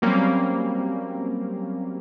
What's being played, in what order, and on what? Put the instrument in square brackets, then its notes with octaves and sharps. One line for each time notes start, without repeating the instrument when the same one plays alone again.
[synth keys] F#3 G3 A#3 C4 C#4